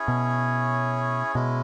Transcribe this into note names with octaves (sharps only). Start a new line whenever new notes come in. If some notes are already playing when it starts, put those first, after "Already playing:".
Already playing: C#4 E4 G#4 C#5
B2
B2 G#3 C#4 E4